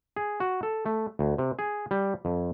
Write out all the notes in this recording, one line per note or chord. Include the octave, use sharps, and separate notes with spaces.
G#4
F#4
A4
A3
D2
C3
G#4
G3
F2